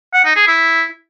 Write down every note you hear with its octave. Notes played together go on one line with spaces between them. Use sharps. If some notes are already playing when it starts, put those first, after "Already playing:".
F#5
D#4
G#4
E4